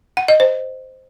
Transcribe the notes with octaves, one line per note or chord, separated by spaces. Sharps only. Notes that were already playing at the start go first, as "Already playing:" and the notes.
F#5
D#5
C5